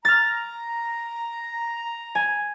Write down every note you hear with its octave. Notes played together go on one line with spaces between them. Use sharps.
A#5 F6 A6
G#5